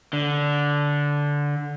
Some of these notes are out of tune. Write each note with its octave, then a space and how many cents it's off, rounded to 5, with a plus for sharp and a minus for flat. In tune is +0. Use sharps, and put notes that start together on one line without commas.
D3 -10